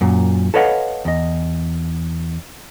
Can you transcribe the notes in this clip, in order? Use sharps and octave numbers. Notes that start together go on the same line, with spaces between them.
F#2 A#2
A4 B4 C#5 D#5 F5 F#5
E2 D#5